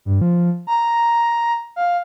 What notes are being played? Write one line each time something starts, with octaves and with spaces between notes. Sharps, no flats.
G2
F3
A#5
F5